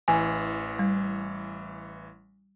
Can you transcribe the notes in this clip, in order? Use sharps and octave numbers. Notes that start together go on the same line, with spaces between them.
A1 E3 G#5
G3